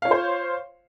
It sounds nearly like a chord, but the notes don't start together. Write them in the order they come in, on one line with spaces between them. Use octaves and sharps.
F5 C#5 F4 C5